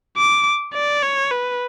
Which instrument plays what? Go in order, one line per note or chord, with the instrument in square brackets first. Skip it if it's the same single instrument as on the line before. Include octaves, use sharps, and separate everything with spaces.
[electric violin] D6
D5
C#5
B4